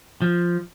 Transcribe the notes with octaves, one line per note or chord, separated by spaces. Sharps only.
F3